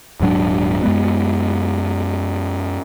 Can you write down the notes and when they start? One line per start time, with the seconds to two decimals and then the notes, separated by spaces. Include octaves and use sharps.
0.20 D#1 G#2 F#3 D4
0.83 F#2 G#3 B3